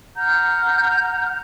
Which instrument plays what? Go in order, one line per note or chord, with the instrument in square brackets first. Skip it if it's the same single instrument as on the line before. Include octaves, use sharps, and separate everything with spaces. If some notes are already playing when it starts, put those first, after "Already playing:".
[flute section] F#5 A#5 F6 G6